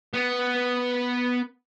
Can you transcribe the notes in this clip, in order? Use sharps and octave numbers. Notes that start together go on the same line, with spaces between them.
B3